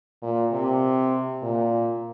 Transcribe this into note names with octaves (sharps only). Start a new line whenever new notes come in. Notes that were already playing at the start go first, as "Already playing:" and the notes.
A#2
C3
A#2